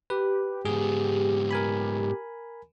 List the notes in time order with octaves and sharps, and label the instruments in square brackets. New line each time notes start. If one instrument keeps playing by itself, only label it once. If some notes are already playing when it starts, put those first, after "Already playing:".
[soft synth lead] G4 [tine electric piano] B4
[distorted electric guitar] G#2 B3 [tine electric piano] G#4
[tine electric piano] A#4 G#5 B5